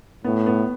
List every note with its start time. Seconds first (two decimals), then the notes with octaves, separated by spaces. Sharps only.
0.24 A2 B3
0.46 B3